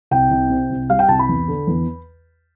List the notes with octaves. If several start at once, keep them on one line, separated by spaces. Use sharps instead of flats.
C2 G5
C2
C3
C2
G3 F5
G5
C2 A5
B5
E2
D3
E2